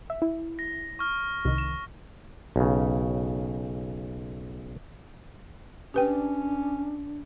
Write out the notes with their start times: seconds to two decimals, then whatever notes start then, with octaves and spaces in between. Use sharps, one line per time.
0.10 E5
0.22 E4
0.59 A#6
0.99 C#6 F6
1.45 C2 D#3
1.58 E7
2.56 B1 C#3
5.94 C#4 D4 G4 B4 G5